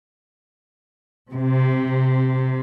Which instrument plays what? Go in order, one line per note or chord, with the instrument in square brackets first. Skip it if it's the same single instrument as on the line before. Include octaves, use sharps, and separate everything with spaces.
[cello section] C3